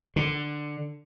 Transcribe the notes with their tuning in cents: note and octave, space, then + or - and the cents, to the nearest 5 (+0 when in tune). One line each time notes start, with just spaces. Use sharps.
D3 +10